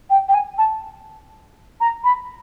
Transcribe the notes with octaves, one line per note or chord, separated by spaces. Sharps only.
G5
G5
G#5
A5
A#5
B5